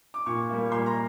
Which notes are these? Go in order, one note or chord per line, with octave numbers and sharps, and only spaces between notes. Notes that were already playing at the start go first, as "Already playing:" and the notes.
D6
A#2 C#6
G3 A#3
A#2 C6
A#5